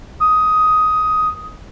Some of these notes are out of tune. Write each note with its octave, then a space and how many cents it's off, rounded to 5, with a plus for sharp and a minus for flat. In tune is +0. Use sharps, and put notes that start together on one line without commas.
D#6 +10